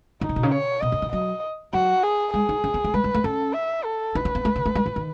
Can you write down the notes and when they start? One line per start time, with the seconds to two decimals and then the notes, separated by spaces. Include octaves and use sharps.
0.21 D#3 D#4
0.29 C#3
0.36 B2
0.43 C#3
0.52 C#5
0.82 B2 D#5
0.92 C#3
1.02 D#3
1.12 F#3 D#5
1.73 F#3 F#4
2.03 G#4
2.33 G#3 G#4
2.49 D#4
2.64 C#4
2.74 B3
2.84 A3
2.94 G#3 B4
3.04 G#3
3.14 A3
3.24 C#4 A4
3.55 E5
3.85 A4
4.15 D#4 B4
4.25 C#4
4.35 B3
4.45 A3
4.56 C#3
4.66 A3
4.75 G#3
4.86 E3
4.96 D#3